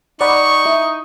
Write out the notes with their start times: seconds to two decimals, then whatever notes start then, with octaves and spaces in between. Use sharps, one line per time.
0.21 D#4 D5 F#5 B5 C#6
0.66 E4